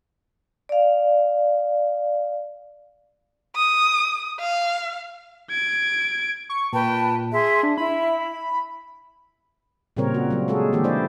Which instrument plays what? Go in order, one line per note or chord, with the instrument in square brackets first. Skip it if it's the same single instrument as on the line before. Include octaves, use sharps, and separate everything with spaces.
[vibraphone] D5 F5
[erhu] D#6
F5
[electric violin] G#6 D7
[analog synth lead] C#6
[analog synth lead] A#2 [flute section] B4 G5 A5
[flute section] G#4 E5 C6
[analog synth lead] D4
[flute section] E4 [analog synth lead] B5
[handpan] A#2 C#3 G3 C4 A#4 C#5
F#4
F#3 A#3
G#3 F#4 G#4 A4
D3 E3 A#3 G4
F3 E4 C5 D5